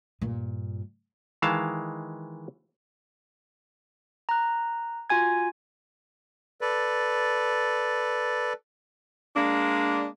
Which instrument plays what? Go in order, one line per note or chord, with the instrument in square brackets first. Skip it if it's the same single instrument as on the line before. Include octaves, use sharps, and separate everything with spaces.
[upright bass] G2 A#2
[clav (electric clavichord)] D#3 E3 G#3 F5 A5
[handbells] A#5 F#6
F4 F#4 G#5 G#6
[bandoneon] A4 B4 D5
[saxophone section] G#3 A#3 D4